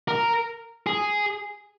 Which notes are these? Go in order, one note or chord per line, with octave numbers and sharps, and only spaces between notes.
A#4
G#4